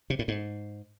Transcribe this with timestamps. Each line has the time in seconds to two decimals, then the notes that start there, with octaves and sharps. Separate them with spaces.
0.10 C3
0.19 A2
0.28 G#2